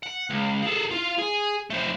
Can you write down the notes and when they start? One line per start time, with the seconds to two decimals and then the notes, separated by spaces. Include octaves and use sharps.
0.03 F#5
0.30 C#2
0.63 G#4 A4
0.91 F4 F5
1.18 G#4
1.70 A3 C4